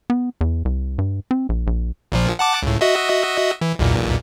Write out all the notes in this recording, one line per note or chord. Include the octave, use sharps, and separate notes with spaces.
B3
E2
C2
G2
C4
A#1
A#1
A#1 A#2 F3
F#5 A5 D6
C#2 A2
F#4 D#5 E5
E3
B1 E2 A#2